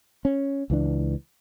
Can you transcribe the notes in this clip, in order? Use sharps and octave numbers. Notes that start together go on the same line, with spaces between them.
C#4
C#2 E3 D4